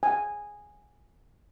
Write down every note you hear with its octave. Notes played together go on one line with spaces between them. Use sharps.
G#5